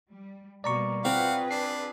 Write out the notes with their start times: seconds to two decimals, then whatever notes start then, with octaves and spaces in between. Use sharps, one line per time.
0.10 G3
0.64 B2 G3 A#3 D5 A#5 C#6
1.05 C4 F4 G#4 B4 F5 F#5
1.51 D4 C7